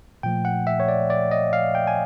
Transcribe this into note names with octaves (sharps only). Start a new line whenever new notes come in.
A#2 F3 A3 G5
F#5
E5
C#5
D5
D5
D#5
F5
G5
G#5